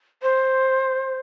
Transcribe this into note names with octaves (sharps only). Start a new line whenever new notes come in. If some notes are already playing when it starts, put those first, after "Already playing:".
C5